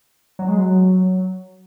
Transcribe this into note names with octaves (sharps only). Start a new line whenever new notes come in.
F#3
G#3
F#3